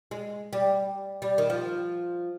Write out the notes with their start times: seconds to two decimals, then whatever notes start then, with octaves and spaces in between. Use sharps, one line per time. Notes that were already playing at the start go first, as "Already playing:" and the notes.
0.11 G#3
0.53 G3
1.22 G3
1.38 D#3
1.50 F3